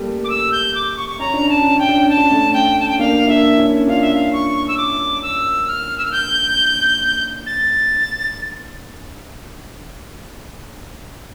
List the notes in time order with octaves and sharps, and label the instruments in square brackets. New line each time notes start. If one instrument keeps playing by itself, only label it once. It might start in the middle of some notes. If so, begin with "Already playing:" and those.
Already playing: [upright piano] G3 A3 A#3
[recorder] D6
E6
G6
D6
C#6
C#6
[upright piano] C#4 [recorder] A#5
[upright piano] D4
[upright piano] C#4 [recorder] A5
[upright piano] D4
[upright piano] C#4 [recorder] G5
[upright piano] D4
C#4
[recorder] A5
[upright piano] D4
A3 C#4
[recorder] G5
A5
G5
[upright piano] A#3 D4 [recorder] F5
[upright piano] E4
[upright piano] A#3 D4 [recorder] E5
[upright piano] C#4 E4
[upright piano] D4 F4 [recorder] F5
[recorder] E5
F5
C#6
E6
D6
E6
F6
E6
F6
G6
A6